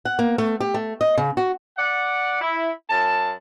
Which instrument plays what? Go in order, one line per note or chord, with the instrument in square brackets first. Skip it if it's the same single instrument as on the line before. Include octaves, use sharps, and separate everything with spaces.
[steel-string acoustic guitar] F#5
A#3
A3
G4
A3
D#5
C#3
F#4
[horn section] D5 F#5
E4
F#2 A5